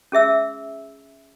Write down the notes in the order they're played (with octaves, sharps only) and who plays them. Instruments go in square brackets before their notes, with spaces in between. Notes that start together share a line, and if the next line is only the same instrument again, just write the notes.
[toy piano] C#4 G#4 E5 E6